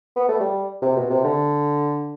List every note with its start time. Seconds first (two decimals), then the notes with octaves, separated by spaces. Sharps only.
0.16 B3
0.28 A3
0.40 G3
0.82 C3
0.97 B2
1.10 C3
1.24 D3